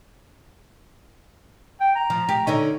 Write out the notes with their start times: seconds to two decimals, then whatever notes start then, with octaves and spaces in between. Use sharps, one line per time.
1.81 G5
1.95 A#5
2.10 F3
2.29 G4
2.47 D3 C#4 D#4